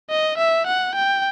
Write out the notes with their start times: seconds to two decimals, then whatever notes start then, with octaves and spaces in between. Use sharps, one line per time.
0.10 D#5
0.38 E5
0.67 F#5
0.95 G5